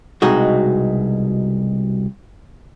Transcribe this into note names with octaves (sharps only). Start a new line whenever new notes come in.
C2 B2 G#3 D#4 F#4